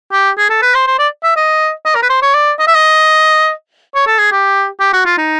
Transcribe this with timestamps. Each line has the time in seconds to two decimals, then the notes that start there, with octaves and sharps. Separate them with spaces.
0.13 G4
0.38 G#4
0.50 A4
0.62 B4
0.75 C5
0.87 C5
0.99 D5
1.24 E5
1.36 D#5
1.86 D#5
1.95 A#4
2.03 B4
2.10 C5
2.22 C#5
2.34 D5
2.59 D#5
2.67 E5
2.75 D#5
3.95 C#5
4.07 A4
4.19 G#4
4.32 G4
4.80 G4
4.93 F#4
5.06 F4
5.18 D#4